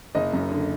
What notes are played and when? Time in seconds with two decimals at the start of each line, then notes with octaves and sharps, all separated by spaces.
0.15 F#1 D#5
0.33 F#2
0.51 D3